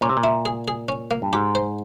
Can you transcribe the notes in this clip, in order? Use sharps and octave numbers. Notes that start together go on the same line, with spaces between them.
A#2 C#4
C3
A#2
E4
G#4
G#4
C#4
A#3
G2
G#2 G4
C5